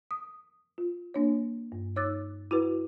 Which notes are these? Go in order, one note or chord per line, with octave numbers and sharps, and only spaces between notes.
D#6
F4
A#3 D4 C#5
G2
D#4 C#5 D6 E6 F#6 A6
E4 F#4 B4